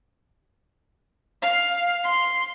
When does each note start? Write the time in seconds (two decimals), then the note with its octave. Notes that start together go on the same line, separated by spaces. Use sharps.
1.42 F5
2.05 C6